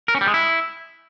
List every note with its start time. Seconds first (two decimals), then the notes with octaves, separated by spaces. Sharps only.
0.08 A#4
0.15 C#4
0.21 G3
0.27 G#3
0.34 E4